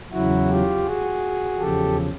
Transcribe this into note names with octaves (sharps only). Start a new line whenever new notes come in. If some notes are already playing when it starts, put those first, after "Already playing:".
E2 C#3 F#3 E4 F#4
F4 G4
F#4 G#4
E2 C#3 F3 G4 A4